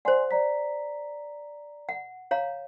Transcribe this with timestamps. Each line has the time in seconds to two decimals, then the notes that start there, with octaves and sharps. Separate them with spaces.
0.05 C5 D5 F#5 G#5 C6
0.31 D5 A#5 B6
1.89 F#5
2.31 C#5 F5 A#5